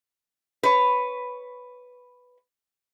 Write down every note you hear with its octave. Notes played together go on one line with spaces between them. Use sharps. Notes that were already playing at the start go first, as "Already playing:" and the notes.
B4 C#5